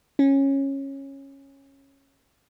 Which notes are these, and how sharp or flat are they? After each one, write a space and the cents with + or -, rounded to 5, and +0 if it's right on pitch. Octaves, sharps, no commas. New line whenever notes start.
C#4 -15